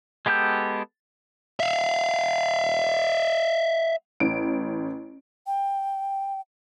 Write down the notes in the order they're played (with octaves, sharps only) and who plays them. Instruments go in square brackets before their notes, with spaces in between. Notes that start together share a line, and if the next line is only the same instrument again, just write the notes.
[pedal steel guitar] G#3 B3 G4 A4 G6
[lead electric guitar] E5 F5
[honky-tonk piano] A1 D7
[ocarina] G5